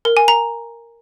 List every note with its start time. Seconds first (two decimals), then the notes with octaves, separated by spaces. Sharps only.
0.05 A#4
0.17 G#5
0.28 A#5